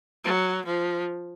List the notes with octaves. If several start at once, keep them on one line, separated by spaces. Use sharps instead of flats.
F#3
F3